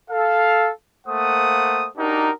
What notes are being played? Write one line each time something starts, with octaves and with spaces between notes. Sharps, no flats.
A4 F5
A3 A#3 C5 F#5 D#6
D4 D#4 F#4 G4 A#4